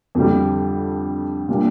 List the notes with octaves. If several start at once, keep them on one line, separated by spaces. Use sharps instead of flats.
F2 D3 G3
A#2 G3 A#3 D4